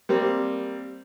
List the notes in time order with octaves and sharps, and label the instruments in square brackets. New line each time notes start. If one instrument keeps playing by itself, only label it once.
[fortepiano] G3 A#3 C4